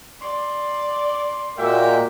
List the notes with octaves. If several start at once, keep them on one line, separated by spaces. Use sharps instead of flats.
D5 C6
A#2 G#3 A#3 F#4 A#4 E5 G5